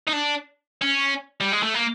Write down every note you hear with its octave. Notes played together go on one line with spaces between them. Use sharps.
D#4
D4
C#4
G3
G#3
A3
A#3